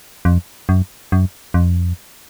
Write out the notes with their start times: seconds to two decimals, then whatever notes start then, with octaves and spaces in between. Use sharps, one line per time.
0.25 F2
0.69 F#2
1.12 F#2
1.54 F2